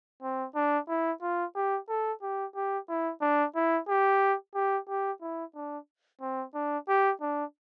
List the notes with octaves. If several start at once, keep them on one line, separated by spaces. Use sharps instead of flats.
C4
D4
E4
F4
G4
A4
G4
G4
E4
D4
E4
G4
G4
G4
E4
D4
C4
D4
G4
D4